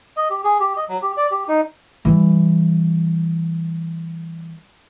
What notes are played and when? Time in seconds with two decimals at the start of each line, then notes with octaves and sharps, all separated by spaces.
0.17 D#5
0.30 G4
0.44 G#4
0.60 G4
0.77 D#5
0.89 F#3
1.02 G4
1.17 D5
1.31 G4
1.48 D#4
2.05 E3 G3